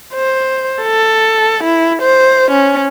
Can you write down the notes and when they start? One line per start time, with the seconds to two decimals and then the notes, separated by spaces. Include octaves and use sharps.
0.14 C5
0.82 A4
1.63 E4
2.02 C5
2.51 C#4